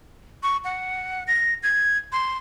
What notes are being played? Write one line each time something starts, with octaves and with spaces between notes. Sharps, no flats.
C#6
F#5
A#6
G#6
C6